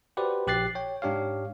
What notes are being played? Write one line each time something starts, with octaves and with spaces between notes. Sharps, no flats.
F#4 G4 B4 C5 D5
A#1 G4 F#6 A6 C7
C#5 G5
G#2 D4 G4 C#5 F5